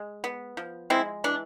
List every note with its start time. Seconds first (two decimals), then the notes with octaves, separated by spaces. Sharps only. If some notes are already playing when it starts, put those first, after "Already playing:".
Already playing: G#3
0.24 B3
0.57 F3
0.90 G#3 C4 E4
1.24 E3 D4